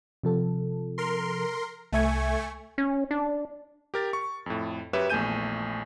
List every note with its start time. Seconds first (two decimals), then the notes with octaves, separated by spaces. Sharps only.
0.23 C3 F3 A4
0.98 A#4 C6
1.92 C2 A3 E5 G#5 C#6 G#6
2.78 C#4
3.11 D4
3.94 G4 A#4 A6
4.13 C#6
4.46 F2 A2
4.93 F#2 G4 B4 C#5 E5 E7
5.10 A#1 E2 A3 G#5 G6 D#7